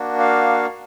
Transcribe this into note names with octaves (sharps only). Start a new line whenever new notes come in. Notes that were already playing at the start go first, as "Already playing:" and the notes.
Already playing: A#3 D4 F#4
F5